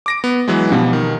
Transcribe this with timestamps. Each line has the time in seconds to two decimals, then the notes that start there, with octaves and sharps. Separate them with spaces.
0.06 D6 A#6 D7
0.24 B3
0.48 E3 F#3 G#3
0.72 G#2 B2 F3 G3
0.93 D#3